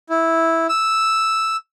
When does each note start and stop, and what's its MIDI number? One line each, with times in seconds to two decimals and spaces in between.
0.10 0.67 64
0.69 1.56 88